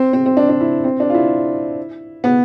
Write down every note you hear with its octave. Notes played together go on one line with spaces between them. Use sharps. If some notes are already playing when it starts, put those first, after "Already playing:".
Already playing: C4
C4
C4
D4
D4
E4
C4
D4
F4
E4
B3